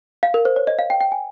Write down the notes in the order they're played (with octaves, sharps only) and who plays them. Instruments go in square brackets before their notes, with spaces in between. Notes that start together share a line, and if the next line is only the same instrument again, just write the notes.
[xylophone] F5
A#4
C5
C#5
D#5
F5
G5
G5
G#5